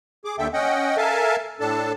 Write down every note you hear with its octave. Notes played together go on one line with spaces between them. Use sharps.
G#4 D6
D#2 D3 A4 E5 G5
C#4 D#5 F#5 G5
A4 A#4 E5 F5 G#5 A5
A2 D4 A4 A5